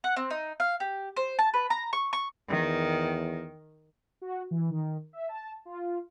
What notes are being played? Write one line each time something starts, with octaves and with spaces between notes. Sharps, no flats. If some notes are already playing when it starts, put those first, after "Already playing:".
F#5
C4
D#4
F5
G4
C5
A5
B4
A#5
C#6
C#6
E2 D#3
F#4
E3
D#3
E5
A5
F4